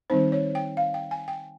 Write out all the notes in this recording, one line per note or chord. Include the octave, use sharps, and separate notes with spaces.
D#3 G3 C4 D#4 C5
C#5
G5
F5
G5
G#5
G5